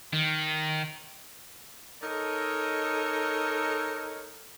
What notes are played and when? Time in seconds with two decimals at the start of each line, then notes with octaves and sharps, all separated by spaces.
0.13 D#3
2.02 D#4 A4 A#4 C#5 D#5